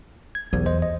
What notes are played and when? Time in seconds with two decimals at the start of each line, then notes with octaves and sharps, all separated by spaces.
0.35 G#6
0.53 B1 E2
0.66 C5 D#5
0.82 D#5